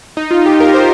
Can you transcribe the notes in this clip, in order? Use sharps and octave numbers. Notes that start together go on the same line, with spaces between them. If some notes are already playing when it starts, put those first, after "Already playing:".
D#4
F4
G4
A#4
C5